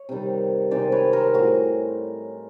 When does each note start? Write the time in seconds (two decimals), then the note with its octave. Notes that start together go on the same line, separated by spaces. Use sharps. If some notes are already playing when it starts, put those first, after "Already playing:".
Already playing: C#5
0.09 C3 D#3 G3
0.71 C3 D#3 G#3 C5 D5
0.92 B4 C#5
1.13 A#4 C5
1.34 A2 F#4 G#4